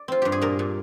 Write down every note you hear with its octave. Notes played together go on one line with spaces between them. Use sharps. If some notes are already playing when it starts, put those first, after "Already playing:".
Already playing: D5
C4 F4
G2 G4
G#4
A#2 A#4
A#2